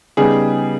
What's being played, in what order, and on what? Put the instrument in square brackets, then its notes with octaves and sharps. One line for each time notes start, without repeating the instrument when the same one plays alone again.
[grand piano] C#3 G3 B3 D#4 G#4